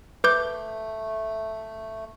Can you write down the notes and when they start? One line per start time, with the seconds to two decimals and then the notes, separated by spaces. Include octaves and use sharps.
0.24 A3 B4 D6 G6